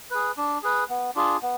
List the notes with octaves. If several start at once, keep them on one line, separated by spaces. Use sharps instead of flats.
G#4 B4
D4
G#4 B4
B3
D4 F4 G#4
B3